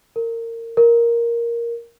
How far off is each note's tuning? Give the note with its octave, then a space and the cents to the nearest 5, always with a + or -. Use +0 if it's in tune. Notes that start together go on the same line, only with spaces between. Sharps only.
A#4 -25
A#4 +5